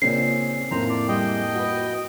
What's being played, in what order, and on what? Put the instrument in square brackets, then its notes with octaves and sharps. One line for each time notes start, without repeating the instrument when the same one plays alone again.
[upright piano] A#2 C#3 [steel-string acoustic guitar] C4 C#4 D#4 [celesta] C7
[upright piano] F2 A2 A#3 [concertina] C5 A#5
[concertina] D5
[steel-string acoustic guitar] G3 E4 G#4 [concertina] D#5 G5
[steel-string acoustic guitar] F#4 B4